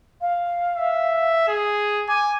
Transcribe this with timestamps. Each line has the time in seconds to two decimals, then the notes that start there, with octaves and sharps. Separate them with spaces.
0.21 F5
0.76 E5
1.48 G#4
2.08 G#5 D6